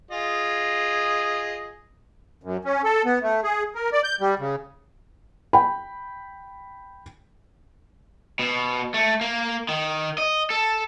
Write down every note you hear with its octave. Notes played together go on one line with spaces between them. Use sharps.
F4 G#4 D#5
F#2
C#4
A4
B3
A3
G#4
A#4
D5
G6
G3
C#3
G5 B5
B2
A3
A#3
D#3
D#5
A4